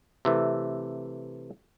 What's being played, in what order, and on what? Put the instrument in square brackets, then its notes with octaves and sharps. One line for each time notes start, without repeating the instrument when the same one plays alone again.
[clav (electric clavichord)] C3 E3 A3